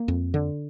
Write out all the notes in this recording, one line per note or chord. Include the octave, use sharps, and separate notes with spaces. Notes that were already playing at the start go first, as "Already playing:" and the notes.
Already playing: A#3
F2
D3